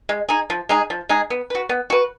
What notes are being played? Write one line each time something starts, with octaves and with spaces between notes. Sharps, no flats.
G#3
D#4 G#4
F3
G#3 D#4 G#4
F3
G#3 D#4 G#4
B3
F#4 B4
B3
F#4 B4